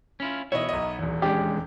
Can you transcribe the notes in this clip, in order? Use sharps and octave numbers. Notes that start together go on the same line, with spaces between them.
C#4 E4 F4
B2 E3 B3 C#5 D#5 E5
B1 D#5
D#1 E2
G#3 C#4 D4 G4